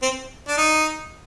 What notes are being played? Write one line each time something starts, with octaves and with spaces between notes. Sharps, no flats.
C4
D4
D#4